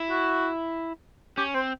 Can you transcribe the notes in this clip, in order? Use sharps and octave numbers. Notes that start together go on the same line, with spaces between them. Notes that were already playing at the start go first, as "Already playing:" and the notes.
Already playing: E4
F#4
C#4 G4
C4 C5